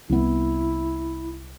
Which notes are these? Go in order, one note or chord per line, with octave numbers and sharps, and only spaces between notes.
C2 B3 E4